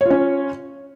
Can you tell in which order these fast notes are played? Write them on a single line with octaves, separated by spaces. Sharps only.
C#5 F4 C#4